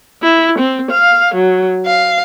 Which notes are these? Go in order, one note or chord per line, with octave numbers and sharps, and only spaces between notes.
E4
C4
F5
F#3
F5